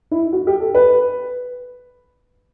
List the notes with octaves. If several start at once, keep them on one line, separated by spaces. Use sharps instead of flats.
E4
F#4
G4
A4
B4